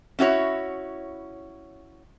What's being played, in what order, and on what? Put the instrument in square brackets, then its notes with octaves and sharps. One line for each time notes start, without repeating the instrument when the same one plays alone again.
[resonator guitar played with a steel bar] C#4 E4 F#4 C#5